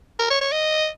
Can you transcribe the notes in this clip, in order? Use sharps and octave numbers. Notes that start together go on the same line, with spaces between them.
A#4
C#5
C#5
D#5